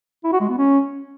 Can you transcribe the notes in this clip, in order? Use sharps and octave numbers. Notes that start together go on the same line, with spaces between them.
E4
F#4
G#3
B3
C#4